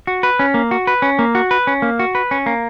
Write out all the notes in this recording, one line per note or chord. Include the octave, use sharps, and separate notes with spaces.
F#4
B4
C#4
A#3
F#4
B4
C#4
A#3
F#4
B4
C#4
A#3
F#4
B4
C#4
A#3